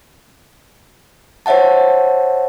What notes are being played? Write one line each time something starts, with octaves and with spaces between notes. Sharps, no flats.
C5 C#5 E5 F#5 A5